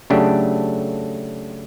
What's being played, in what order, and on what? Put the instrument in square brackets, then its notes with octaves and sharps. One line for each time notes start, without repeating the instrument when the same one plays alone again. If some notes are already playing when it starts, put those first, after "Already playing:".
[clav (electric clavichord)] C#3 F#3 A3 D4 G4